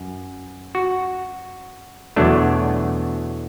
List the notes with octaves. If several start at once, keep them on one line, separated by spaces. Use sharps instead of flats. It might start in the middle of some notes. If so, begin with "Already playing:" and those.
Already playing: F#2
F#4
E2 B2 F#3 A3 D4